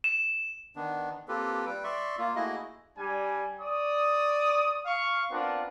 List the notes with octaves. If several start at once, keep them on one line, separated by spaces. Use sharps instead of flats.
E7
D#3 B3 D4
A#3 C4 F4 G4 A4 B4
G3 B4 G5
D5 E5 C6 C#6
A#3 F4
A3 A#3 E4 F#4 G#4 D#5
G3 D4 G4 G#5
D5 C#6 D#6
F5 C#6
B3 C4 D4 F4 A#4